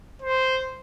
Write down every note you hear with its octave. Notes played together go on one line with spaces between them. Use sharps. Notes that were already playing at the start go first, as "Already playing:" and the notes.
C5